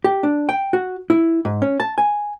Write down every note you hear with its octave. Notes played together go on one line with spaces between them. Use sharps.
G4
D4
G5
F#4
E4
G#2
C#4
A5
G#5